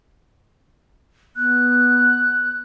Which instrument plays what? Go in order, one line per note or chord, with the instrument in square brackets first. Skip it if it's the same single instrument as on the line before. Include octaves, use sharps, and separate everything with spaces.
[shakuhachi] B3 [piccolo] F#6